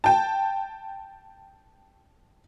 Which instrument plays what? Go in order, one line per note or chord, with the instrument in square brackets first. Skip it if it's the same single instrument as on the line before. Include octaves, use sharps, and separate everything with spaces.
[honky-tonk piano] G5 A5